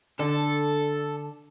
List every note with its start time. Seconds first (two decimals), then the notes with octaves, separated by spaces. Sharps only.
0.19 D3 A4